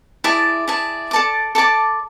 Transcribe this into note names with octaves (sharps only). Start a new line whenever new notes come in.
E4 G#4 D5 A5
E4 G#4 D5 A5
A4 D5 A5 D6
A4 D5 A5 D6